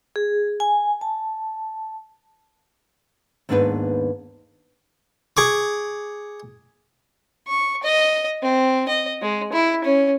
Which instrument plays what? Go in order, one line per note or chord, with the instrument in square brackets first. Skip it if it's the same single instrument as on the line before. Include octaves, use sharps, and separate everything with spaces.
[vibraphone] G#4
G#5
A5
[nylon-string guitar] D#2 G#2 B3 D4 D#4 B4
[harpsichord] G#4 C#6 D6
[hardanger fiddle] C#6
D#5
C4
D#5
G#3
E4
C#4